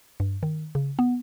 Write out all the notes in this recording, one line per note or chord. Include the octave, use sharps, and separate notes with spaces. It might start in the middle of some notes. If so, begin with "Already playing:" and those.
G2
D#3
C#3
B3